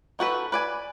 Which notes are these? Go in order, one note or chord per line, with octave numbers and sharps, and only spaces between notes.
D#4 F#4 A4 B4
B4 D5 G#5